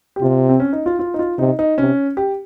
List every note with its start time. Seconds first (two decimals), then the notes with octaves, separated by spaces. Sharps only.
0.16 G4
0.22 C3 F4
0.49 C4
0.60 C#4
0.73 D#4
0.86 F4
0.99 F4
1.14 D#4
1.19 F4
1.38 C3 D#4
1.59 D#4
1.78 C3 C#4
2.17 G4